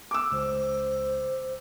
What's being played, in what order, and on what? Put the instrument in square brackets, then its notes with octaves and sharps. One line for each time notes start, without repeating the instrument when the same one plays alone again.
[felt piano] D6 E6
[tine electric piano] C#2 [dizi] C5